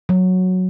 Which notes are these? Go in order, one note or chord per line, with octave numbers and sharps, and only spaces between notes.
F#3